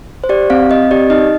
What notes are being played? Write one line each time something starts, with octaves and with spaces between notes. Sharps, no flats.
C5
G4 D5
C4 F5
C4 D#5
G4 D5
D#4 D#5